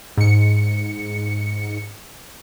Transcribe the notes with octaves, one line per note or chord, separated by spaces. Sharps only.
G#2 C#7